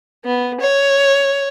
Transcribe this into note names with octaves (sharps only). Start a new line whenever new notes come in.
B3
C#5